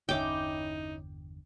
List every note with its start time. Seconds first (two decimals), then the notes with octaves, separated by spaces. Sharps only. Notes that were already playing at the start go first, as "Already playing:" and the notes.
0.09 G1 E2 D3 C#4 D#4 E4 G5 D6